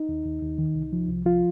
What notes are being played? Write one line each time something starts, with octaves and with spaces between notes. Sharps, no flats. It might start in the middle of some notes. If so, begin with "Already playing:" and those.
Already playing: D#4
D#2
D#2
D#2
D#3
C2
F3
C2
F3 F4